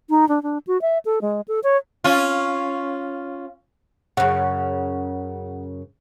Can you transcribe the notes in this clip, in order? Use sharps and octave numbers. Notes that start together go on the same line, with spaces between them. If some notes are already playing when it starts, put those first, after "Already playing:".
D#4
D4
D4
F#4
E5
A4
G#3
A4
C#5
C#4 F4
F#2 C#3 F#5